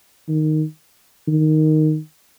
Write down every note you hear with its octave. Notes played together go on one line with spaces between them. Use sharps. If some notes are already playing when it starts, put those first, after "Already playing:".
D#3
D#3